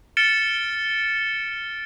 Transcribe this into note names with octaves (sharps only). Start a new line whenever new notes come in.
F6 A6 C#7 D7 E7 G7